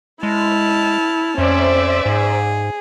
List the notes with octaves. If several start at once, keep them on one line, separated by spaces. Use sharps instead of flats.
G#3 E4 A5 F6
F2 C#4 C5 D5 E5
G#2 G#4